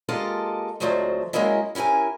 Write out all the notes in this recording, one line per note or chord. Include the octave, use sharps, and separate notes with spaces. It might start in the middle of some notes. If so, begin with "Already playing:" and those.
G#3 A#3 F4 G4 A4 D#5
D2 F3 F#3 G#3 A3 C4
F#3 G#3 A#3 C#4 E4 D#5
C#4 E4 G4 A#4 G#5